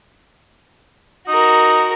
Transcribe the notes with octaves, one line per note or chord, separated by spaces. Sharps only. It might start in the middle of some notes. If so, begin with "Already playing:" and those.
D#4 F#4 A#4